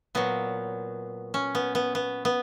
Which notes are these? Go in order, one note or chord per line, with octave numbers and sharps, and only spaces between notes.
A#2 F#3 B3
C#4
B3
B3
B3
B3